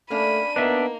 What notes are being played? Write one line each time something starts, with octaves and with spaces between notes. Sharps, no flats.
A3 A#3 C#4 D4 B5 D#7
A#3 B3 D4 D#4 E5